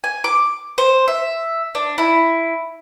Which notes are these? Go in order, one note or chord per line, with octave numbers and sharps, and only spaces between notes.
G#5
D6
C5
E5
D4
E4